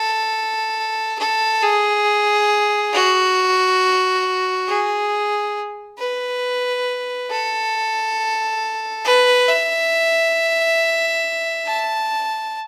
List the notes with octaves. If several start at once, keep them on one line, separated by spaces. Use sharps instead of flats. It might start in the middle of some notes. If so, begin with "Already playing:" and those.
Already playing: A4
A4
G#4
F#4
G#4
B4
A4
B4
E5
A5